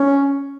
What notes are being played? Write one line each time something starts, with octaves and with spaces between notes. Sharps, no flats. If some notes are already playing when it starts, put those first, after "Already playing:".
Already playing: C#4